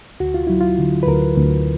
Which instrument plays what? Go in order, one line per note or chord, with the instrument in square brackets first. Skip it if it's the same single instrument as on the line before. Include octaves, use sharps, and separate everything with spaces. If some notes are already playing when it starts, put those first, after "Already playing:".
[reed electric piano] D2 F#4
F4
F#3 E4
F4
D3
B4
D2 A#4
D2